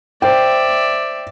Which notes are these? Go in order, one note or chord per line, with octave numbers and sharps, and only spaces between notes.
C5 D5 E5 G5